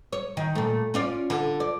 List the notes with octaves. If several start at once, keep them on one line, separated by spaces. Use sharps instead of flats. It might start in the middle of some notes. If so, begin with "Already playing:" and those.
C#5
D#3
A#2 A3
C#4 F4 D5
D3
D5